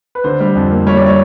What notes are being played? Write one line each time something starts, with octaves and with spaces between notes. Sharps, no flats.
B4
D3 C5
G3
F2
A#3
G3 C#5
D5
G3 C#5